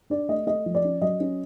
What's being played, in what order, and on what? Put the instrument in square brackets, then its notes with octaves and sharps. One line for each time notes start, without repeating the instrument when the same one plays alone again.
[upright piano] D4 D5
A3 D#5
A3 D#5
F3
D5
C#4
F#3 D#5
C#4